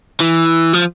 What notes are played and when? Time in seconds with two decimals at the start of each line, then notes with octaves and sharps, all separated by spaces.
0.20 E3
0.73 F3